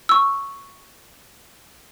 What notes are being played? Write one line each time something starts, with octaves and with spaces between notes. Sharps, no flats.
C#6 E6